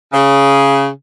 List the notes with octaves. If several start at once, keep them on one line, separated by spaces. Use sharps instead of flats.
C#3